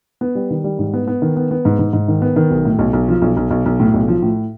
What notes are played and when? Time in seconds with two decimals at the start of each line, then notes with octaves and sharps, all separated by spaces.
0.21 B3
0.35 G3
0.50 D#3
0.64 G3
0.79 G#2
0.94 B3
1.07 B3
1.22 D#3
1.37 B3
1.51 B3
1.65 G#2
1.79 G#2
1.93 G#2
2.08 D#3
2.22 B3
2.36 D#3
2.51 B1
2.65 A2
2.79 B1
2.93 B1
3.08 F3
3.22 B1
3.37 B1
3.50 B1
3.66 B1
3.80 A2
3.94 B1
4.08 F3
4.23 A2